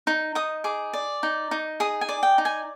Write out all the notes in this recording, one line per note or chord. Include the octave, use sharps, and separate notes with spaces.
D#4
D#4 D#6
G#4 D6
D5
D#4
D#4
G#4 D#6
G#5
D5
G5
D#4
G#5